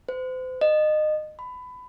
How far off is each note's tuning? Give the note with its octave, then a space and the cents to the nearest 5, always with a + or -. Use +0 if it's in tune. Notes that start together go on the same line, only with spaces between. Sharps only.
C5 -40
D#5 -25
B5 +20